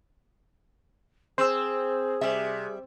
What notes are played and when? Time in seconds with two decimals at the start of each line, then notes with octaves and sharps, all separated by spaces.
1.38 C4 G#4 C5 E6
2.21 C3 G3 E5